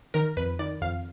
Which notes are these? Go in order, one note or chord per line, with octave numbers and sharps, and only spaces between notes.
D#3 A#4
F2 B4
D#3 D5
F2 F5